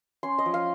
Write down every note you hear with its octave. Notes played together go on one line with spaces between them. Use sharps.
C#4 C6
D#5
F3
F5